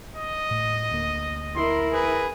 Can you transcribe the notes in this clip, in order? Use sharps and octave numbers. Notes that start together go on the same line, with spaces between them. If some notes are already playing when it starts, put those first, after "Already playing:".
D#5
A2
D2 A#3
E4 A#4 C6
G#4 B4